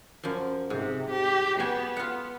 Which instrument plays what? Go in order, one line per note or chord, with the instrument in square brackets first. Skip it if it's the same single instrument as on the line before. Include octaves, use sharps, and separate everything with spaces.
[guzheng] F#2 F3
[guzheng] G#2 [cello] C3
[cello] G4
[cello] B3 [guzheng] F#4 G5 G#5
[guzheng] F4 F#5